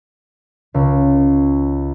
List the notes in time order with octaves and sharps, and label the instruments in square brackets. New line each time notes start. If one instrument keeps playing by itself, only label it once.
[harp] C#2